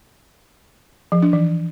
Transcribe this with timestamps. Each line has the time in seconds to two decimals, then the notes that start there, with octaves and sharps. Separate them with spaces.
1.12 F3
1.23 D4
1.33 E3